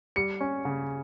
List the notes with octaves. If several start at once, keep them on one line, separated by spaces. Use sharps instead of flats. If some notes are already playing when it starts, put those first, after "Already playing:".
G3 C#7
C#4
C#3